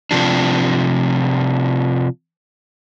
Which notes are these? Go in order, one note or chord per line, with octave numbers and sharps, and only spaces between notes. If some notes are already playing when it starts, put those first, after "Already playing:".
C3 F3 D4